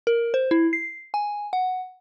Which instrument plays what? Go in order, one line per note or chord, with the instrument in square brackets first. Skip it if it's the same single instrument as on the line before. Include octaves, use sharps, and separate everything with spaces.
[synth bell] A#4
C5
E4
C7
G#5
F#5